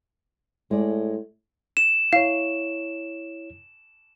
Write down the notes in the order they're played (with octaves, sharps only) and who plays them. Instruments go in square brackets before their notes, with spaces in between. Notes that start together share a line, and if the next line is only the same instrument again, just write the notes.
[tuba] A2 [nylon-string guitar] G#3 D5
[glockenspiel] E7
[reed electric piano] E4 C#5 [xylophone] F5